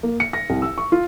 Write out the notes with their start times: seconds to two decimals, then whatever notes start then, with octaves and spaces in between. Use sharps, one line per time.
0.03 A#3
0.20 C#7
0.33 A#6
0.50 C2
0.62 E6
0.78 C#6
0.92 F4